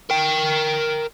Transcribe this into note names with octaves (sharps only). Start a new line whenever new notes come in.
A#4 G5